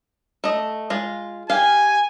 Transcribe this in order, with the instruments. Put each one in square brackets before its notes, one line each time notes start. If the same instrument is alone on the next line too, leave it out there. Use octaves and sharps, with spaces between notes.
[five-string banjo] A3 D#5
G#3 F4
[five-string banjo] G4 F5 [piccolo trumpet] G#5